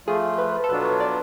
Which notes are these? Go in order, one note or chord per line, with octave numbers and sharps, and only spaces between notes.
F3 A3 F4 G#4
B4
A4
B2 F#3 B3 D4 F4 B4
C#5
D5